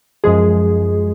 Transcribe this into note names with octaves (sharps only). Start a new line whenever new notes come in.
F#2 F3 G#3 G#4